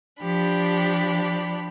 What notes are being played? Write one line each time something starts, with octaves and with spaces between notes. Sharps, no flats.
F3 D4 G4 B5